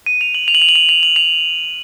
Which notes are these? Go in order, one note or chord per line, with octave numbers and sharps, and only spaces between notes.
D#7
F7
F#7
F7
F#7
F7
F#7
F7
F7
F#7
F7